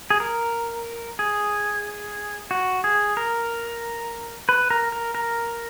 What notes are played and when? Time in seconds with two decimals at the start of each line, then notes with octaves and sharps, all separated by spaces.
0.10 G#4
0.20 A#4
1.19 G#4
2.51 F#4
2.84 G#4
3.17 A#4
4.49 B4
4.70 A#4
4.92 A#4
5.15 A#4